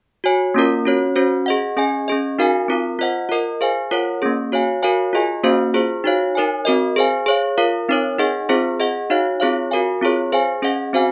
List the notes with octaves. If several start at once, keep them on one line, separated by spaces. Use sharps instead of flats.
F#4 C#5 G#5
A#3 C#4 F4 A#4
C#4 F#4 C#5
C#4 F#4 C5
G#4 D#5 F#5
C#4 G#4 D#5 G#5
C#4 G#4 D#5
D#4 F#4 A#4 F5 G#5
C4 F4 A#4
F4 C5 D#5 F#5
F4 A#4 D#5
G#4 C5 F5 G#5
F4 A#4 C#5 F#5
A#3 C#4 G#4
F#4 C#5 F5 G#5
F#4 A#4 C#5 F5 G#5
F4 G#4 D#5 G#5
A#3 C#4 F#4 C5 F5
F4 G#4 C5
D#4 F#4 C#5 F5
D#4 A#4 C#5 G#5
C4 F#4 A#4 D#5
G#4 C5 F5 G#5
G#4 C#5 F5
F4 A#4 F5
C4 D#4 A#4 C#5
D#4 G#4 D#5 F#5
C4 F4 G#4 C5
G#4 D#5 F#5
D#4 F#4 C#5 F5
C4 F4 G#4 C#5 F5
F#4 A#4 F5 G#5
C4 F4 G#4 C#5
G#4 C5 F5 G#5
C#4 G#4 D#5 F#5
C4 F#4 C5 F5 G#5